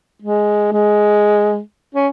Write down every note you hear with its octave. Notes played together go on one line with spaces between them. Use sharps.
G#3
G#3
C#4